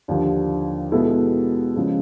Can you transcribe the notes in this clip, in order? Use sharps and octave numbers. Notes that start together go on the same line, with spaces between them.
D#2 D3 F3
B2 G#3 B3 E4 A4
C#3 F3 G#3